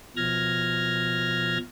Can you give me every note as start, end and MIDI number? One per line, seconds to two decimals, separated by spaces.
0.17 1.58 47
0.17 1.58 53
0.17 1.58 89
0.17 1.58 92
0.17 1.58 94